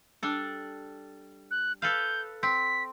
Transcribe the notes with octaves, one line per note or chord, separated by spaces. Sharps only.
G3 D4 A4
F#6
A4 B4 F5 G6
C4 B6